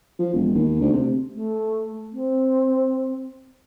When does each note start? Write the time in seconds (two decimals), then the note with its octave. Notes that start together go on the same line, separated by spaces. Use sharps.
0.19 F3
0.33 E1
0.54 D#2
0.81 D2
0.93 C3
1.35 A3
2.13 C4